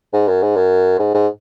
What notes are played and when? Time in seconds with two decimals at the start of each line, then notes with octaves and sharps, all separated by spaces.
0.13 G#2
0.28 F#2
0.43 G#2
0.56 F#2
0.99 G#2
1.14 G#2